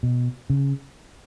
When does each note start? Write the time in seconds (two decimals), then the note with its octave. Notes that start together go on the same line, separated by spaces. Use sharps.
0.03 B2
0.50 C#3